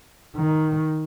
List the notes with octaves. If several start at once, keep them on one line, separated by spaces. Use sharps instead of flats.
D#3